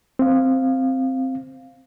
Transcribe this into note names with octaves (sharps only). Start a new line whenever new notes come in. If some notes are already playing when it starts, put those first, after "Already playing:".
C4 F5